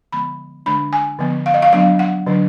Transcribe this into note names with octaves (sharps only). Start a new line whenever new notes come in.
D3 F3 G#3 B3 B5
D3 G#3 D4 B5
G#5
D3 F3 B3
F5
D#5
F5
F#3 B3 D4 F5
F#5
D3 F#3 D4